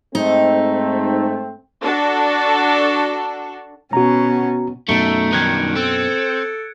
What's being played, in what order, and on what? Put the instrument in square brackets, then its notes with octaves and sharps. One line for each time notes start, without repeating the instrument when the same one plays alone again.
[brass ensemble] G#2 A3 C4 [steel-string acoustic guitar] D#4
[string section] D4 F#4 A4
[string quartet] B2 C#4 [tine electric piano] F#4 A#5
[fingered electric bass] F#2 B2 [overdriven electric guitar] A3 [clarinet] D#4 [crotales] C#7 D7
[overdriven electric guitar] G2 D#3 [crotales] F#6 G#6
[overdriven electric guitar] C4 [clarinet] A4